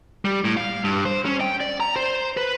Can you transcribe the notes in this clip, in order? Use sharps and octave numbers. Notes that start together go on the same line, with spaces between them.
G3
A2
F5
G2
C5
C#4
G5
D5
A#5
C5
B4